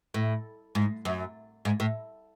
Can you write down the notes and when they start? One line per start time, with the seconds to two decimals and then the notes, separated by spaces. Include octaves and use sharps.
0.14 A2
0.75 G#2
1.05 F#2
1.65 G#2
1.80 A2